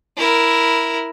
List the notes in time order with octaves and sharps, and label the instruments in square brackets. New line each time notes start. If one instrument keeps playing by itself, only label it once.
[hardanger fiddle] E4 A#4